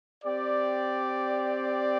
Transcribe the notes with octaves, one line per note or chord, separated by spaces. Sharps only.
C4 G4 D5